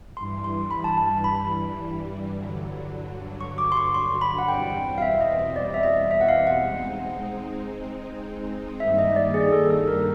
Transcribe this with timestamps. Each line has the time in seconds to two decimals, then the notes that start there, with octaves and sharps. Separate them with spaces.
0.17 G2 E3 G3 C6
0.44 C6
0.71 B5
0.84 A5
0.98 A5
1.24 B5
2.33 G2 D3 F#3
3.41 C#6
3.58 D6
3.72 C6
3.77 C#6
3.94 C6
4.21 B5
4.38 F#5
4.48 E2 B2 G3 C4 G5
4.98 F5
5.02 E5
5.21 D#5
5.39 D#5
5.56 D5
5.74 E5
5.83 D#5
6.11 E5
6.21 F#5
6.29 F5
6.47 F#5
6.64 G#3 C4 D#4
8.80 G2 D#3 G3 A#3 D#4 E5
8.99 D#5
9.16 D5
9.34 G#4
9.52 A4
9.70 A4
9.88 A#4